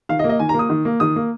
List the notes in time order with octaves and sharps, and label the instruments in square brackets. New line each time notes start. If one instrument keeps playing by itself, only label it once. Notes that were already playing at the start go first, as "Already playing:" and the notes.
[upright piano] D#3 F5
D#5
A#3
D#5
D#3 G#5
A#5
A#3
D#6
D#3
A#3
D#3 D#6
A#3